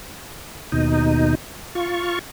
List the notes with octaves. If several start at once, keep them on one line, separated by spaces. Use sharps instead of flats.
D#2 B2 D#4
F4 C#6